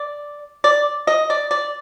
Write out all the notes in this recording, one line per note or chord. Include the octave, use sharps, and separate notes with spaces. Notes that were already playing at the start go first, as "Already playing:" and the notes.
Already playing: D5
D5
D#5
D5
D5